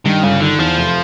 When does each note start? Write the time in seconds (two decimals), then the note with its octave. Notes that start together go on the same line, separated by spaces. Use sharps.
0.06 G2 D#3
0.23 G1 C#3
0.40 D3 D#3
0.59 E2 F3
0.77 F1